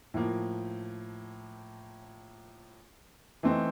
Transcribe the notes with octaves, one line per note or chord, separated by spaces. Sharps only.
A2 F3 A#3
E3 A3 C4 D#4